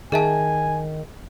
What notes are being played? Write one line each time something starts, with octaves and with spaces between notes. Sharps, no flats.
D#3 G#4 E5 G#5 A5